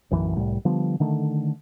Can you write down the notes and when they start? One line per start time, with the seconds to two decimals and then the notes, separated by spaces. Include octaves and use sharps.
0.11 D1 B1 F#2 E3
0.36 C2 A2 G3
0.65 D3 F3 G3 B3
1.00 D3 D#3 A3